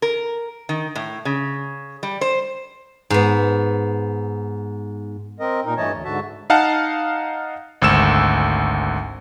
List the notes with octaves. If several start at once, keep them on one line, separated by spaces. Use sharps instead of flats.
A#4
D#3
A2
C#3
G3
C5
G#2 B3
C4 A#4 D#5
A#2 D#4 A#4
G2 E3 A3 C#5 D#5 A5
D2
G#2 D3 F#4 E5 A5
D#4 F5 F#5 A5
G#1 D2 E6 E7